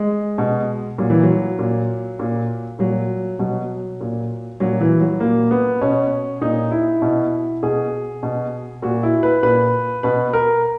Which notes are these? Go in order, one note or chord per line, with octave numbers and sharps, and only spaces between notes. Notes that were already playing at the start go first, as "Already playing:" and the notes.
Already playing: G#3
B2
A#2 F#3
E3
F#3
A#2
A#2
A#2 F#3
B2 F#3
A#2
A#2 F#3
E3
F#3
A#2 A#3
B3
B2 C#4
A#2 D#4
E4
B2
B2 G#4
B2
A#2 F#4
E4
B4
A#2 B4
B2 B4
A#4